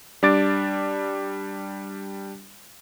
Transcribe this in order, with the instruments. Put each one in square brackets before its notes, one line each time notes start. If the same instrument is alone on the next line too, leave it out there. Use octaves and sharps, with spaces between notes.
[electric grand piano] G3 D4 D6 A6 D7